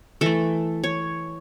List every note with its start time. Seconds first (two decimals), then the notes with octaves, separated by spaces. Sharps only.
0.21 E3 A3 A4
0.84 C#5